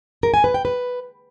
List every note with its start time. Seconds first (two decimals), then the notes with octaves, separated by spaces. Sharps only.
0.23 A#4
0.34 G#5
0.44 B4
0.54 G5
0.65 B4